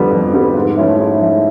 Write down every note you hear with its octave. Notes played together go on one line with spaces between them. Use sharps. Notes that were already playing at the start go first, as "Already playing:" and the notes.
Already playing: F2 D3 G3 B3
F2
D3 G3 B3
G#2
F3 A3 C#4 E4
G#2
F3 A3 C#4 E4